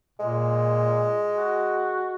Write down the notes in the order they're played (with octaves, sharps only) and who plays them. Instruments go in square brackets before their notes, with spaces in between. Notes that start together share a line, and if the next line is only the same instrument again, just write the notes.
[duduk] A#2 [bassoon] G#3
[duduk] F#4